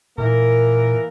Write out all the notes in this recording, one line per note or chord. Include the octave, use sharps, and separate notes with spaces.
A#2 E3 A#3 A#4